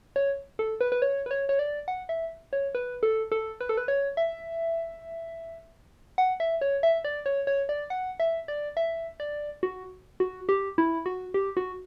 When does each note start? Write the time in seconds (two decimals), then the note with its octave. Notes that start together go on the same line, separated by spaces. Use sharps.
0.16 C#5
0.59 A4
0.81 B4
0.92 B4
1.02 C#5
1.26 B4
1.31 C#5
1.49 C#5
1.59 D5
1.88 F#5
2.09 E5
2.53 C#5
2.75 B4
3.03 A4
3.32 A4
3.61 B4
3.69 A4
3.77 B4
3.88 C#5
4.17 E5
6.18 F#5
6.40 E5
6.61 C#5
6.83 E5
7.04 D5
7.26 C#5
7.47 C#5
7.69 D5
7.90 F#5
8.20 E5
8.48 D5
8.77 E5
9.20 D5
9.63 F#4
10.20 F#4
10.49 G4
10.78 E4
11.06 F#4
11.34 G4
11.57 F#4